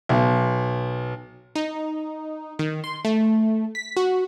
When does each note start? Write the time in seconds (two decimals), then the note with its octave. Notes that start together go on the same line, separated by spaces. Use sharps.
0.09 B1
1.55 D#4
2.59 D#3
2.84 C6
3.05 A3
3.75 B6
3.97 F#4